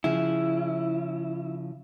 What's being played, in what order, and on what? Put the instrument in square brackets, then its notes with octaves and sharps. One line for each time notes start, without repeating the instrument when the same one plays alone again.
[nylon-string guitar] C#3 F3 G#4 [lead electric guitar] E4